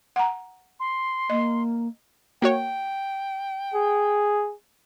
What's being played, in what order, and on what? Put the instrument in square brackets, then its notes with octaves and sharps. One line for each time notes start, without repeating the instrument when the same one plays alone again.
[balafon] F#5 A#5
[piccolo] C6
[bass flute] A#3 [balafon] D#5
[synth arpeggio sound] A#3 F#4 C#5 [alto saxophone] G5
[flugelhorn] G#4